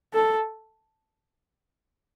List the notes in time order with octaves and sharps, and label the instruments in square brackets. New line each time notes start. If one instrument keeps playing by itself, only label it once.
[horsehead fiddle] A4